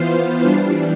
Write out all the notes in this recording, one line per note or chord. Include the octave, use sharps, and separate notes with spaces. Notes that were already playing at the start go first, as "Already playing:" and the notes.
Already playing: E3 B3 F4 C5 F5
E3 G3 D4